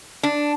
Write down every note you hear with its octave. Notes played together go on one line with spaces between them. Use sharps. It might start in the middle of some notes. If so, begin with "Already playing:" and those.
D4